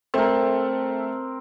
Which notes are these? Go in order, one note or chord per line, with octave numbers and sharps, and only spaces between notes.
A3 C4 A#4